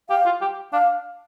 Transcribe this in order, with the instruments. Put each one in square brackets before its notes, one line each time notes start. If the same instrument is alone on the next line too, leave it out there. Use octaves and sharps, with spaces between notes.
[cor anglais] G4 [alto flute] F5
[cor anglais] F4
G4
[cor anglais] D4 [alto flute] F5